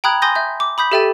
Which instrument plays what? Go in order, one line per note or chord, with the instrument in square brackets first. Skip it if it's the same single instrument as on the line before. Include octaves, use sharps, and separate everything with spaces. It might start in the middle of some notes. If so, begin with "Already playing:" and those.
[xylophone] G5 A#5 B5 D#6 F#6 G#6
G#5 C6 D#6 G6 A#6
E5 G6
D6
B5 D#6 G6 B6
G4 A4 E5 G5 A6 D#7